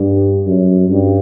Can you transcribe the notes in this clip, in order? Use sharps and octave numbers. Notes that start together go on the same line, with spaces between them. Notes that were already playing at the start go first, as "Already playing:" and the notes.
Already playing: G2
F#2
G2